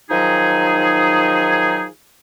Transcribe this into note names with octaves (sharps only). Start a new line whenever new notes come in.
D#3 F3 F#3 D#4 G#4